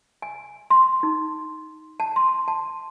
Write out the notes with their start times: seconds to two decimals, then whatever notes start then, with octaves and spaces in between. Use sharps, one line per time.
0.22 G#5
0.70 C6
1.03 D#4
2.00 A5
2.16 C6
2.48 A5